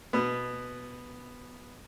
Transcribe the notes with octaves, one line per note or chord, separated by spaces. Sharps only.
B2 B3